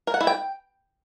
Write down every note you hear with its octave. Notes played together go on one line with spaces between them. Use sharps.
A#4
F#5
E4
G5